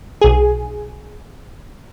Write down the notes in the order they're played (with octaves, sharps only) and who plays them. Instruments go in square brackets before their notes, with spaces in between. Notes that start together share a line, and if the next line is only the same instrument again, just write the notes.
[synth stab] B1 G#4